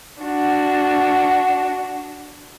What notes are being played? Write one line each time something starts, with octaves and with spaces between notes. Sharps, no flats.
D4 F#4